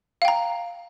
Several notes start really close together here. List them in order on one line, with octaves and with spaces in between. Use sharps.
F5 G5 A#5